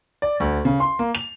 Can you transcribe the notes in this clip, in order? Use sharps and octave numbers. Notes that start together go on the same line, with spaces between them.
D5
D2
C#3
C6
A#3
F7